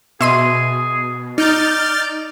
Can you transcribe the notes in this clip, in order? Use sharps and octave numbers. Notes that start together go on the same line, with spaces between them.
B2 G#4 E5 C6 D#7
D#4 D5 F6 G6 A6